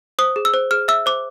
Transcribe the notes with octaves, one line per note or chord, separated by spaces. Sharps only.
C5 D#6
G#4
E6
C5
G#4 F6
E5 E6
C5 D6